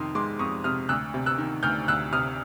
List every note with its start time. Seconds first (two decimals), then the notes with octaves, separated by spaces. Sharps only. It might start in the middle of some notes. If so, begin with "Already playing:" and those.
Already playing: F2 C3 D#3 C6
0.15 G#3 C6 D6
0.39 F2 C#6 D#6
0.64 C3 D#6 F6
0.89 D2 E6 F#6
1.14 C3
1.26 E6 F#6
1.38 D#3
1.63 D2 F6 G6
1.88 D2 E6 F#6
2.12 C3 D#6 F6